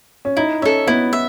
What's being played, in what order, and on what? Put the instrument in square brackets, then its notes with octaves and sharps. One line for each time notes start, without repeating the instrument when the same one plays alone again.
[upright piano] C#4
[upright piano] D#4 [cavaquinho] E4
[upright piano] C#4 [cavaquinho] A4 E5
[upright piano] B3 [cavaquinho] E4
[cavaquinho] E5